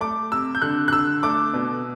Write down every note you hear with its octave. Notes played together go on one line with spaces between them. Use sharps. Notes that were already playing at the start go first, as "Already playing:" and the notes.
A3 D6
C3 E6
G6
D3 F#6
F#6
D3 E6
A3 D6
B2